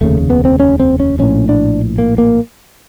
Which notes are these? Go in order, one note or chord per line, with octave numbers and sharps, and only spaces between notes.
F1 D#2 C#3 A3
B3
C4
C#4
C4
C#4
A#1 A2 C#4
D4
A#3
A#3